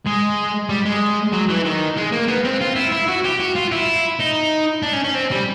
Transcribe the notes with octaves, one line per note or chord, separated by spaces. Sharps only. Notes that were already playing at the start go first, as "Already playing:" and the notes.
G#3
G3
G#3
F#3
E3
D#3
G#3
A#3
B3
C4
F4
E4
E4
F#4
G4
F#4
F4
E4
D#4
D4
C#4
C#4
C4
G3